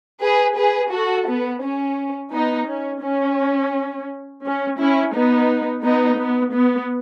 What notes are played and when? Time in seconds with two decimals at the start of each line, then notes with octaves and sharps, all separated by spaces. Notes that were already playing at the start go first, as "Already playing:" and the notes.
0.21 G#4 B4
0.57 G#4 B4
0.92 F#4 A4
1.28 B3
1.63 C#4
2.33 B3 D#4
2.68 C#4
3.03 C#4
4.44 C#4
4.79 C#4 E4
5.14 B3 D#4
5.84 B3 D#4
6.19 B3
6.54 B3